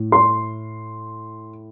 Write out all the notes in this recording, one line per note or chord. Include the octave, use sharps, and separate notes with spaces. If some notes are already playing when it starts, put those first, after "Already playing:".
Already playing: A2
C6